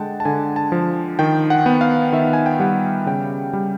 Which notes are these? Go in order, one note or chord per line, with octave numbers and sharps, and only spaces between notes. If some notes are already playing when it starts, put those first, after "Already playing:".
Already playing: D3 G#3 F#5 G5 A5
A5
D3 G#5
A5
F3
D#3 G5
F#5
B3
F5
D#3 E5
G#5
G5
G3 F#5
C#3 G5
G3